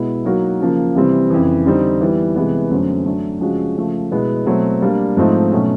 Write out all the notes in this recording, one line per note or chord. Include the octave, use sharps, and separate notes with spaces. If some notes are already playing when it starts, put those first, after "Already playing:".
Already playing: B2 G#3 B3 E4
F#3 A#3 D#4 F#4 A#4
C#3 F3 A#3
C3 E3 G3 C4
F2 C#3 E3
D3 G3 C4 D#4
E3 G3 B3
C3 E3 G#3 B3
F#2 D3 F#3 A3 C4
F#3 A3 D4
C#3 F3 G#3 C#4 F#4
C#3 F3 A3
B2 G#3 B3 E4
B2 F#3 A3 C4
G3 A#3 D4
G#2 F3 A3 C4 D#4
B2 F#3 A3 C#4